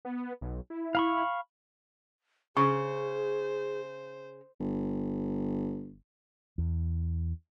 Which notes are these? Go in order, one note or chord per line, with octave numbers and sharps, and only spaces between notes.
B3
B1
E4
F5 B5 C#6
C#3 G#4 C5 C#6
G1
E2